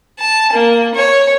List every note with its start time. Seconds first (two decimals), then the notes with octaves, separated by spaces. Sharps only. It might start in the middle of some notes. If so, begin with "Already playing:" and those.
0.19 A5
0.52 A#3
0.95 C#5